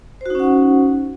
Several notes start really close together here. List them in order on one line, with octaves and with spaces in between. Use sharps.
C5 F#4 D#4 C#4 F#5